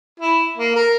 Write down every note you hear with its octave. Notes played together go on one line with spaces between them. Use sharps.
E4
A#3
A#4